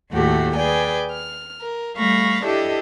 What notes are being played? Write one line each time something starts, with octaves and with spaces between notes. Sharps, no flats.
D#2 A2 A3 F#4 G4 A4
G#4 B4 D5 G5 G#5
F6
A#4
G3 A3 F5 B5 C#6 A#6
D4 E4 G4 A4 D#5 E5